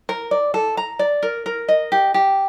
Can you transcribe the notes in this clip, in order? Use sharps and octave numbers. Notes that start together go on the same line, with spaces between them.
A#4
D5
A4
A#5
D5
A#4
A#4
D#5
G4
G4